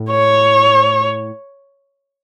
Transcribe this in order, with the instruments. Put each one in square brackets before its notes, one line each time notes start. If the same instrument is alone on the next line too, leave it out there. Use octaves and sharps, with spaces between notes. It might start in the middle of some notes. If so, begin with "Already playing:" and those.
Already playing: [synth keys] A2
[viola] C#5